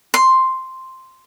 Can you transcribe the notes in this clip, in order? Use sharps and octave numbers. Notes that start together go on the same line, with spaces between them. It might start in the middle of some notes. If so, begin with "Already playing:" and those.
C6